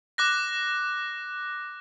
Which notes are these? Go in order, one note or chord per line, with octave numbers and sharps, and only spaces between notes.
D6 F#6 A#6